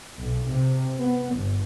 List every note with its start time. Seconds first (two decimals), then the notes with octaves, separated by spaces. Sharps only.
0.20 B1
0.49 C3
1.01 B3
1.35 G1